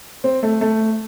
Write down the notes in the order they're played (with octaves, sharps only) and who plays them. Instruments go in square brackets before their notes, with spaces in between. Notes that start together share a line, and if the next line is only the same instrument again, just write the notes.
[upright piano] C4
A3
A3